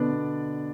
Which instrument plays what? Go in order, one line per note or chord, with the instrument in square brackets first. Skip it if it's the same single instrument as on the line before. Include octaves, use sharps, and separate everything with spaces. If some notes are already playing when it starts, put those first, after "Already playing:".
Already playing: [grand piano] B2 D3 B3 D4 D5
B2